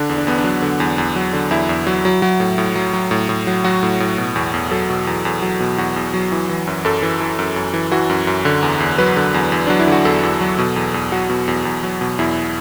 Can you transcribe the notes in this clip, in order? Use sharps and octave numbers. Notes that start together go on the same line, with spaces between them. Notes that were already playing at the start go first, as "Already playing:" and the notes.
Already playing: D3 D4
E2
D4
E2 B3
D4
F#3
D3
E2
E2
F#3
D3
E2 E4
E2
F#3
F#3
F#3
A2
A2
F#3
F#3
A2
A2
F#3
F#3 F#4
A2
A2
B2
E2
E2
F#3 A4
B2
E2
E2
F#3
B2
E2 F#4
E2
F#3
E3
E3
F#2
F#2 A4
E3
E3
F#2
F#2
E3
E3 F#4
F#2
F#2
D3
E2
E2
F#3 B4
D3
E2
E2
F#3 D4
E4
D3 F#4
E2 A4
E2
F#3
B2
E2
E2
F#3 F#4
B2
E2
E2
F#3
B2
E2 E4